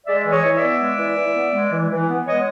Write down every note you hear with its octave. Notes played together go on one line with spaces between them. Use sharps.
G#3 D5 E5
E3
C#5 D#5
E3
B3 D5 E5
G#3
E3
E3
B3
G#3
E3
E3
B3
G#3 C#5 D#5